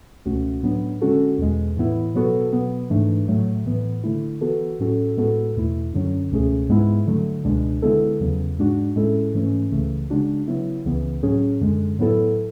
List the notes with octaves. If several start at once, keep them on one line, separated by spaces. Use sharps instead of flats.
C#2 B2 A3 C#4 F#4
A2 F#3 B3 D4
D3 G#3 C#4 F#4 A4
E2 B2 G#3
A2 E3 B3 E4
B2 F#3 B3 F#4 A4
B2 F#3 B3
G#2 E3 A3 D4
A2 F#3 A3
A2 E3 B3
D3 A3 E4
E3 B3 F#4 A4
A2 F#3 C#4 F#4 A4
A2 G#3 B3 F#4 A4
E2 B2 A3 E4
F#2 D3 F#3 C#4
C#2 B2 A3 C#4 G#4
G#2 G#3 B3 E4
D3 F#3 A3
C#2 B2 G#3 D4
D3 G#3 B3 E4 A4
E2 C#3 F#3 B3
G#2 G#3 D4 F#4
A2 G#3 C#4 E4 A4
G#2 E3 A3 C#4
C#2 C#3 E3 A3
C#3 G#3 D4 F#4
C#3 F#3 B3 E4
C#2 C#3 E3 B3
A2 F#3 C#4 G#4
F#2 D3 G#3
A2 F#3 B3 E4 A4